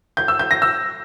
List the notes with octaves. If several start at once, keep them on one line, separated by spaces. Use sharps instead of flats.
G6
E6
G6
A#6
E6